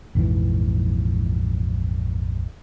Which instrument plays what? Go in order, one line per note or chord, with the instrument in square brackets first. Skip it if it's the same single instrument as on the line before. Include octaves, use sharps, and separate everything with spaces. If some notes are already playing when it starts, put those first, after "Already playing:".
[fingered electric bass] A#1 F2 G#2 E3